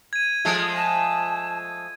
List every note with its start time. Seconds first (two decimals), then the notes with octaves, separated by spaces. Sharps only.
0.13 G#6 D#7
0.45 F3 G#3 A3
0.77 A5